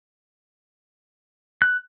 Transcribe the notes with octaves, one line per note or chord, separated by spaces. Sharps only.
F#6